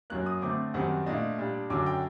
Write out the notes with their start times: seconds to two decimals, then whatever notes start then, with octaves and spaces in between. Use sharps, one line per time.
0.10 F#2 F#3 A#3 F#6
0.26 D#6
0.42 D3 A3 C4 D6
0.74 F#2 D#3 G3 C4 F#5
1.06 A#2 A3 D4 D#5
1.38 A#2 G3 D4
1.70 F#2 D3 F#3 D6
1.86 G5